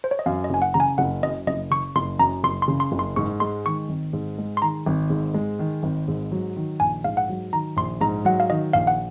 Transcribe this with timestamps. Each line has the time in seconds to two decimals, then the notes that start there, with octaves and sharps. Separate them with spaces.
0.04 C5
0.11 C#5
0.19 D#5
0.26 F#2 F5
0.44 D#5
0.50 F#1 G#5
0.62 F#5
0.74 C#3 A#5
0.80 G#5
0.98 F#1 F#5
1.23 F#2 D#5
1.47 F#1 D#5
1.71 C#3 C#6
1.96 F#1 C6
2.19 F#2 A#5
2.44 F#1 C6
2.62 C6
2.68 C#3
2.80 C6
2.92 F#1
2.99 C6
3.16 G#2 C#6
3.40 G#3 C6
3.66 D#3 C#6
3.89 G#1
4.13 G#2
4.38 G#3
4.57 C6
4.62 D#3 A#5
4.86 G#1
5.10 G#2
5.34 G#3
5.59 D#3
5.83 G#1
6.08 G#2
6.32 F#3
6.57 D#3
6.80 A#1 G#5
7.04 G#2 F5
7.17 F#5
7.29 F#3
7.53 D#3 A#5
7.76 A#1 C6
8.01 G#2 A#5
8.25 F#3 F#5
8.40 F5
8.50 D#3 D#5
8.73 A#1 F5
8.87 F#5